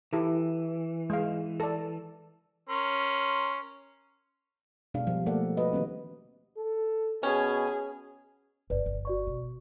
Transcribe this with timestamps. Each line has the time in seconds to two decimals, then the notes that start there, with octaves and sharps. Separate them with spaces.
0.13 E3 E4 G4 A4
1.10 G#3 F5
1.60 A4 D5
2.69 C#4 A#4 C6
4.94 B2 G#3 D4 G#4 F5
5.07 F3 G3
5.26 A3 A#3 A4 D5 F#5
5.57 F#4 B4 D#5
5.73 D#3 G3 B3 C#4
6.58 A4
7.23 B2 C#4 G#4
8.70 G1 B4 D5
8.86 G1
9.05 F#4 D5 C#6
9.27 B2